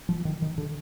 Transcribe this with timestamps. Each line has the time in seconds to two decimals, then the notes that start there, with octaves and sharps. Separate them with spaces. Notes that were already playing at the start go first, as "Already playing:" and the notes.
0.09 F3
0.25 D#3
0.42 D#3
0.58 D3